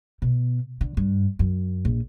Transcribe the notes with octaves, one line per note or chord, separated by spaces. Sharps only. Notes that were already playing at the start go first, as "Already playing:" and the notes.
B2
D3
G2
F#2
A#1